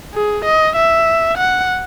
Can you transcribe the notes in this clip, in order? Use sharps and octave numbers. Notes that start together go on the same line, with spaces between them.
G#4
D#5
E5
F#5